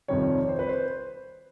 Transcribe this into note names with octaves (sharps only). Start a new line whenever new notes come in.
F2 C3 D#3 G3 C#5
C5
B4
C5